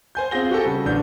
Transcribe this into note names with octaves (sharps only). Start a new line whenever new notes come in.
C5 G#5 G6
C4 F4 G#4 A#6 G7
F#4 G4 A4
C#3 G3
A1 D3 D4 G6